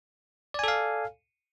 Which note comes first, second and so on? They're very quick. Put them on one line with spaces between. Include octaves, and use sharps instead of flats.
D5 G#5 A4 F5